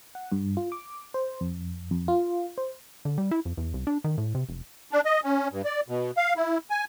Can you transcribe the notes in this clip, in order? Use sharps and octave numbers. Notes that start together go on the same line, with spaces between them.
F#5
G2
F4
D6
C5
F2
F2
F4
C5
D3
G3
E4
F2
E2
C2
D4
D#3
A2
C3
F1
D4
D#5
C#4
G2
D5
B2
F5
E4
G#5